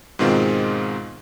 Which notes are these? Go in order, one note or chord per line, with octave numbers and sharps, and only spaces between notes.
G#2 B2 D#3 G#3 C4 F4